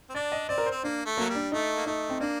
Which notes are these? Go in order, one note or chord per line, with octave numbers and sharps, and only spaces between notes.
C4
D4 D5
D#5
C4 D5
A#4
C4 C5
A#3 D4
A3
F#3 A#3
G3
D4
A3 D#4
A#3
A3 D#4
C4
A#3 D4